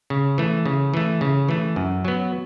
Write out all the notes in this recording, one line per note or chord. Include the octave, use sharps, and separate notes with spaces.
C#3
E3 A3
C#3
E3 A3
C#3
E3 A3
F#2
F#3 B3